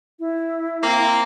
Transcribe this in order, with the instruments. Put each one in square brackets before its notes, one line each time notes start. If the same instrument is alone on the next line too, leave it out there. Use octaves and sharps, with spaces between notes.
[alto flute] E4
[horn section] A#3 C4